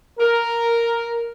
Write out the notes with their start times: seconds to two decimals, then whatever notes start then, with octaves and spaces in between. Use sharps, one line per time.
0.19 A#4